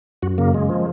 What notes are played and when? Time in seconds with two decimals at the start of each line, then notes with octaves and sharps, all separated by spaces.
0.23 F#2 F#4
0.38 C#3 A#3
0.54 G#3
0.69 F3